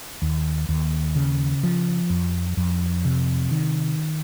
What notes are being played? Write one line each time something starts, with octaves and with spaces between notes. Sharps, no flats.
D#2
D#2
C#3
F3
F2
F2
C3
D#3